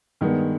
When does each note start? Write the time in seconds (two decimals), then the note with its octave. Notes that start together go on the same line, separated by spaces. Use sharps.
0.21 G2 D#3 G#3 B3